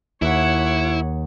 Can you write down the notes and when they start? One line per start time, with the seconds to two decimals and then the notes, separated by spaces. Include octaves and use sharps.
0.22 D#2 E4 C#5 F#5